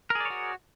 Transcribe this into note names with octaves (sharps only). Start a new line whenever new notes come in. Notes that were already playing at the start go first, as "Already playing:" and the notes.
F#4 G#4 A#4 C#5 D5